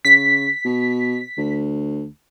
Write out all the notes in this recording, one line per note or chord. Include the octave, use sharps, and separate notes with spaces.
C#3 B6
B2
D2